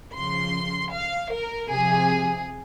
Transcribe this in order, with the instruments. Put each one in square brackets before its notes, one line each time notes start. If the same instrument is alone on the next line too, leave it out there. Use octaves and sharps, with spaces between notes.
[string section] C#3 F3 C6
F5
A#4
C3 F3 G#4